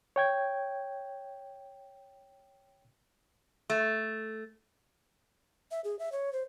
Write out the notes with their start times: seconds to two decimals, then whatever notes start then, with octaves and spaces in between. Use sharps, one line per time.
0.16 C#5 G5 G#6
3.70 A3
5.71 E5
5.84 G#4
5.99 E5
6.12 C#5
6.33 C5